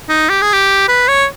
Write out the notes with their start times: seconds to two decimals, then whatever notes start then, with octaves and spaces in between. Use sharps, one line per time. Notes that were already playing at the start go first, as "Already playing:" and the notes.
0.09 D#4
0.29 G4
0.42 G#4
0.53 G4
0.88 B4
1.08 C#5